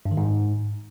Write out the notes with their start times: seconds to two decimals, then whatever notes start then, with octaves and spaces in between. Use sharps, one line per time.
0.05 G2
0.11 D#3
0.17 G#2